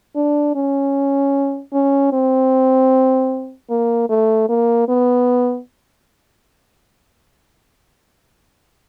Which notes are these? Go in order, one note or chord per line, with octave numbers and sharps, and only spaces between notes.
D4
C#4
C#4
C4
A#3
A3
A#3
B3